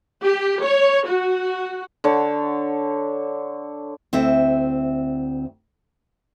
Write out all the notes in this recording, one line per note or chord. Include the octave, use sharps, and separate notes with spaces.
G4
C#5
F#4
D3 C#5 A5
D2 C4 E4 E5